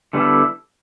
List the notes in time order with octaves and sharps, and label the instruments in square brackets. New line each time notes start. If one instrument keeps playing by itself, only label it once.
[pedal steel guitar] D3 G3 B3 E4 A4